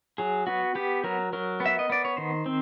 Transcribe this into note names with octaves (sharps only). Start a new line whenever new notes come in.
F#3 G#4
B3 F#4
B3 G4
F#3 A#4
F#3 A#4
B3
E5
D#5
B3 D5
C#5
D#3 C5
C4